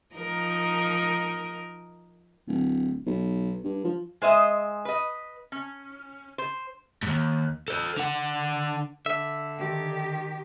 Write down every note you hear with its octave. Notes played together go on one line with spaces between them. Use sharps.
F3 D#4 A#4
D1
B1
G2
F3
G#3 C5 D#5 E5
B4 D#5
C#4
C5
D#2 G#2
A4 C5
D3 F#5
D3 E5
D#3 G4